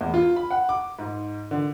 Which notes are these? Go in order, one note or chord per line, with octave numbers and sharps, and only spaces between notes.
E2
F4
B5
F#5
D6
G#2
D3